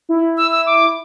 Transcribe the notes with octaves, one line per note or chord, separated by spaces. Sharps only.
E4
E6
E6
D6